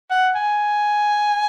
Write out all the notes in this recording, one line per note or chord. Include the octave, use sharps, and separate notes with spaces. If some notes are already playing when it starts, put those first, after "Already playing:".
F#5
G#5